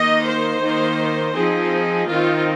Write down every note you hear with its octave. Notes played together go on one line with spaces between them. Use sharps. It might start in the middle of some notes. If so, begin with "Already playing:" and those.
Already playing: D#3 A#3 D#4 D#5
C5
D#3 A#3 D#4
F3 C4 D#4 G#4
D#3 C4 D#4 F4